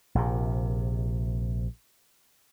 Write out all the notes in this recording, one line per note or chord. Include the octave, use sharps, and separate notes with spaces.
A#1 C3